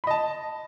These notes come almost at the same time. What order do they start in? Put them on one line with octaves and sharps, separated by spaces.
B5 D#5 A5